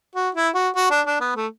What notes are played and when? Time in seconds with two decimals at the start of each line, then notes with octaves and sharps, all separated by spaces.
0.15 F#4
0.35 E4
0.54 F#4
0.75 F#4
0.90 D4
1.06 D4
1.21 B3
1.36 A3